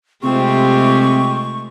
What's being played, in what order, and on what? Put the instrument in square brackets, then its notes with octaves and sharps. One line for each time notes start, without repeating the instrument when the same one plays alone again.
[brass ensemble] C3 G4 [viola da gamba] G#3 A3 F4 [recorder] C4 [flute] C#6